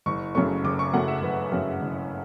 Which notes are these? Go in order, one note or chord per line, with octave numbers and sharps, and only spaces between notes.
F#1 C#6
F#2 C#3 F#3 A3 C#6
F#1 D6
C#6
F#2 C#3 F#3 A3 F#5
E5
F#1 B4
F#2 C#3 F#3 A3
F#1